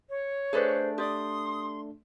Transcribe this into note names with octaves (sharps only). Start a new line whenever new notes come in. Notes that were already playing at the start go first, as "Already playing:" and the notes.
C#5
A3 D4 G#4 A4 B4 C5
G4 D5 C6 D#6